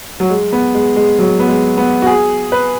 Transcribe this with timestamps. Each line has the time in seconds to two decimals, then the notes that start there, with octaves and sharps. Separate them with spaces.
0.20 F#3
0.30 G#3
0.52 B3
0.74 G#3
0.96 G#3
1.19 F#3
1.39 B3
1.48 G#3
1.77 B3
2.02 F#4
2.07 G#4
2.52 B4